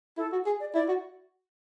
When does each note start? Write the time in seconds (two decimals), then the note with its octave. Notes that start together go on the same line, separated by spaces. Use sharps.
0.17 E4 A4
0.32 F#4
0.46 G#4
0.60 D5
0.75 E4 D5
0.88 F#4